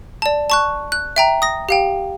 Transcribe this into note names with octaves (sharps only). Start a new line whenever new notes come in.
D5 A5
A5 C#6 F#6
F#6
E5 G5 A#5
D#6 A#6
G4 F5 G5